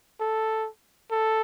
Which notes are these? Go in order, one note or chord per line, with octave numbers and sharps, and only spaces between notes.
A4
A4